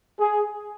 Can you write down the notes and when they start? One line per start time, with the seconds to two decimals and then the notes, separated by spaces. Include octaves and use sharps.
0.20 G#4